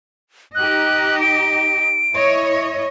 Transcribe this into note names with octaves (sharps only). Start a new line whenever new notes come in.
D#4 G4 D#5 F#6
D7
E4 C#5 D#5